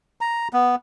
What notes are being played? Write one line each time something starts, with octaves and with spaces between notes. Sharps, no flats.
A#5
B3